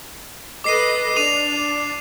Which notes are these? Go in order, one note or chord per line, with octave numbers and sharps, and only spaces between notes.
A4 B4 D#5 D6 C7 D#7
D4 D6 D#7 F7